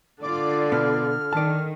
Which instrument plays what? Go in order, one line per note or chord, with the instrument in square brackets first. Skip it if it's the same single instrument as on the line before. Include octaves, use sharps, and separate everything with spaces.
[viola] D3 [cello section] F4 D5 [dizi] D6
[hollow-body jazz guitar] B2 B3 [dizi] F6
[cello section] D#3 [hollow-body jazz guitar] D5 A5